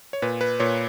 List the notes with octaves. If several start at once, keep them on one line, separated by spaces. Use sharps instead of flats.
C#5
A#2 B4
B4
A#2 C#5